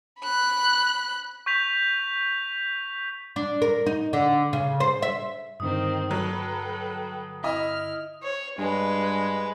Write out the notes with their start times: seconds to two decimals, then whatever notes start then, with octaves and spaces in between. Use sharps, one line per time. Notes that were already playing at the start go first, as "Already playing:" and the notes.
0.20 B5 F#6
1.46 C#6 G6 B6 F7
3.36 D4
3.62 A#4
3.86 D#4
4.13 D3
4.53 C#3
4.80 C5
5.02 E5
5.60 G2 D3 D#3 C4 D#6
6.11 F#3 A4 B4 G5
7.44 E4 D#5 F6
8.23 C#5
8.58 G2 G#3 B4